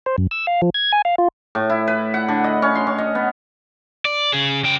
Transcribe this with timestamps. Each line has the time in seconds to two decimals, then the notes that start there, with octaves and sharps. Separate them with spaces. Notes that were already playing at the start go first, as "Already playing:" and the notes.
0.06 C5
0.18 F#2
0.31 E6
0.47 F5
0.62 F3
0.74 G#6
0.92 G#5
1.05 F5
1.18 F4
1.55 A2
1.70 E4
1.87 B4
2.14 F#5
2.28 D3
2.44 D#5
2.62 C#4
2.75 C6
2.87 C#4
2.98 D#5
3.15 B3
4.05 D5
4.33 C#3 G#4
4.64 C#3 G5